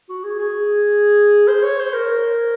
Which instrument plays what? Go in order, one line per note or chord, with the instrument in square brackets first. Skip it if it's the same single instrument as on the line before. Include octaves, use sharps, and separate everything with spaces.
[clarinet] F#4
G#4
G#4
C5
C#5
C5
A#4